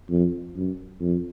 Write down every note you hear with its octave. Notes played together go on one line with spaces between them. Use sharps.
F2
F#2
F2